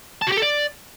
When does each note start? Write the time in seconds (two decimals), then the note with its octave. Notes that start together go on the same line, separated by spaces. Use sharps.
0.22 A5
0.27 F#4
0.32 G4
0.37 A4
0.42 D5